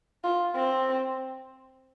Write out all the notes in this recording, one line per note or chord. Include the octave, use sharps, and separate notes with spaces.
F4
C4